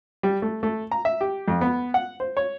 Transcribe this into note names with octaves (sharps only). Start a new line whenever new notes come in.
G3
A3
A3
A#5
E5
G4
F2
B3
F#5
C5
C#5